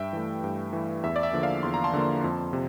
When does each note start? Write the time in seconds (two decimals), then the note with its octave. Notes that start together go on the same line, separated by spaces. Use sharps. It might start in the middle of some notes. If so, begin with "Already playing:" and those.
Already playing: G2 E5 G5
0.13 E3 A3
0.44 G2
0.73 E3 A3
1.03 E2 E5
1.16 D5
1.23 E5
1.33 D3 F3 A#3
1.43 D5 F5
1.63 E2 C6
1.74 A#5
1.84 A5 C6
1.93 D3 F3 A#3
2.24 F2
2.53 C3